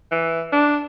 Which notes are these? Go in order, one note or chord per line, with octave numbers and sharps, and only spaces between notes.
E3
D4